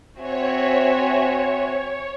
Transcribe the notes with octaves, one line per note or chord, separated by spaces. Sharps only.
C4 F#4 C5 C#5 E5 G#5